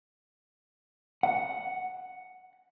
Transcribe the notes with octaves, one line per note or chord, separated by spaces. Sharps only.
F#5